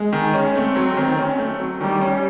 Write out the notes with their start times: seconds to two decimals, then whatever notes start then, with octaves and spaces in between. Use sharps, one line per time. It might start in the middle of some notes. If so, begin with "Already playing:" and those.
Already playing: G#3
0.13 D#3
0.34 C#4
0.55 A3 C4
0.76 F#3
0.97 D#3
1.18 C#4
1.38 A3
1.60 F#3
1.81 D#3 G3
2.02 C#4